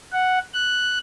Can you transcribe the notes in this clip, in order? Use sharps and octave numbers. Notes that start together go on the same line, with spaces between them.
F#5
F#6